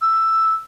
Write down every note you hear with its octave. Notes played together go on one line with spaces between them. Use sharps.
E6